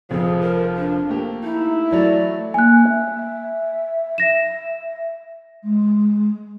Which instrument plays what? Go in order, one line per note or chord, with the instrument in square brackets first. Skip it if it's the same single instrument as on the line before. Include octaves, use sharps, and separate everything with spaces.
[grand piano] F1 F2 [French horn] F3 [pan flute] G#4
[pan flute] A#4
D4
[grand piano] A3 A#3 G4
[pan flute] D#4 [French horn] E4
[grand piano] E3 F#3 A3 [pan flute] D5
[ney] A#3 [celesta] G#5 F#6
[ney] E5
[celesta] A#6 E7
[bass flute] G#3